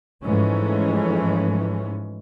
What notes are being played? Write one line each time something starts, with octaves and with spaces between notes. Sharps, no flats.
G#2 E3 F3 G#3 A3 C#4